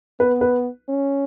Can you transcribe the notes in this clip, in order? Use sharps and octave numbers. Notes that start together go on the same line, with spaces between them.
B3 B4
B4
C#4